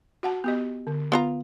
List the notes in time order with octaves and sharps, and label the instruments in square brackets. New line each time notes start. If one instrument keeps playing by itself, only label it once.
[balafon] F#4 F#5 A5
B3 G4 D#5
D3
[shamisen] B3 F4 A#5